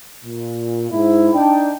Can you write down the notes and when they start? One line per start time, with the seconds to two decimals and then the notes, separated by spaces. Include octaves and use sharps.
0.25 A#2
0.91 G#2 E4
1.34 D4 D#4 G5